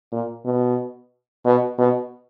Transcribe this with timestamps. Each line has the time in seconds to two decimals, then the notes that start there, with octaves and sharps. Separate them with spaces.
0.12 A#2
0.45 B2
1.45 B2
1.78 B2